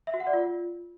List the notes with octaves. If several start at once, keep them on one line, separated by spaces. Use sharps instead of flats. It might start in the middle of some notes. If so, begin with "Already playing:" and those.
E5
F#4
F#5
D5
F4